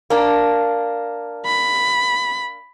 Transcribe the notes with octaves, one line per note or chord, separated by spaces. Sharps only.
A#3 D4
B5